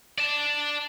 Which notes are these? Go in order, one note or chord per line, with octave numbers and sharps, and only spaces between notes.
D5 A5